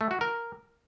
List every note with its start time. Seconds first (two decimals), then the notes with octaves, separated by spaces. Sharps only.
0.01 A3
0.11 F#4
0.21 A#4